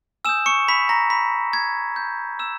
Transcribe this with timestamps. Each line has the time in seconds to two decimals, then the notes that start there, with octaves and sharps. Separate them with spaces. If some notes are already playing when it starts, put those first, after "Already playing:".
0.25 G#5 D#6 E6 G6 E7
0.46 C#6 C#7
0.68 B5 B6
0.89 A#5 A#6
1.10 B5 B6
1.53 G#6
1.96 G6
2.39 E6 E7